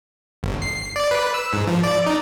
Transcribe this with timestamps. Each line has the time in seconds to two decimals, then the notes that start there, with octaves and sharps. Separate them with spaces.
0.43 G1
0.62 C7
0.96 D5
1.11 B4
1.34 E6
1.53 G#2
1.67 F3
1.83 D5
2.06 D#4